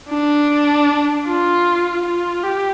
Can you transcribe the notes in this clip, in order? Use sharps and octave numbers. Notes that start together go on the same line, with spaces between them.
D4
F4
F4
G4